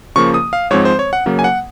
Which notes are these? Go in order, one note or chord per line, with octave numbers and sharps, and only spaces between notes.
C#3 F3 A#3 C#6
D#6
F5
G#2 F3 G#3 C4 C#5
C5
C#5
F#5
C#3 F#3 A#3
G#5
F#5